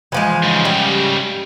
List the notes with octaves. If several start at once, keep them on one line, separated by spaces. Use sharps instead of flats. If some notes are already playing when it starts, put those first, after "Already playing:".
E3 F3 G#3
G#2 C#3
G3